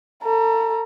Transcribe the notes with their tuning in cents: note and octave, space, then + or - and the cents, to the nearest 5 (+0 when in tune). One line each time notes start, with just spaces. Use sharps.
A4 +40 A#5 +30